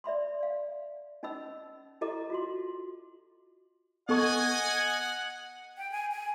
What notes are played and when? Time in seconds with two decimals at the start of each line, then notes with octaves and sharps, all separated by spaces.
0.04 D5 E5 B5 C6
0.40 D5 F5
1.23 C#4 D#4 D#5 B5 E6
2.01 E4 G4 A4 D#5 A#5 D6
2.30 F4 F#4 C6
4.09 B3 A4 D#5 F#5 G#5 C#6
5.77 G5
5.91 G#5
6.11 G#5